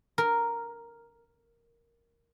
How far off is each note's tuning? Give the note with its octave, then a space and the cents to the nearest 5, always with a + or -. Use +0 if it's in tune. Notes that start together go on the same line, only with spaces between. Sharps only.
A#4 +0